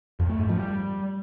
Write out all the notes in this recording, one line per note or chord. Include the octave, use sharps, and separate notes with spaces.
F2
A3
G#2
F3
G3